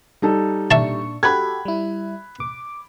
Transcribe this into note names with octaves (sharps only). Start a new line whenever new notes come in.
G3 D#4 A4
A#2 D4 E5 A5 C#6
F#4 G4 A4 B5 F#6 G#6
G3 E4
D6